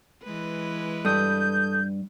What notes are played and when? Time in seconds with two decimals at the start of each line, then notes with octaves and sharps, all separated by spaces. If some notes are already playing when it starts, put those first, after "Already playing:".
0.24 E3 G#3 B4
1.05 G2 A4 D#6 G6